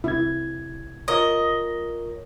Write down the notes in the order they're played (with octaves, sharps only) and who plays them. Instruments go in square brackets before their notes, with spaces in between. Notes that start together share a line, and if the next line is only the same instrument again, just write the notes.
[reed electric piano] C2 G#6 [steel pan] E4
[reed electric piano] F4 A#4 C#5 [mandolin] D#5